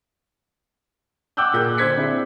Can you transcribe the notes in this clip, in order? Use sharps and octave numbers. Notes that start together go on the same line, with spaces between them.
F#5 G5 D6 E6 F#6 G6
A#2 G#4 F#6 G6
D3 C5 G#6 B6 C#7
C4 D4 E4 G#4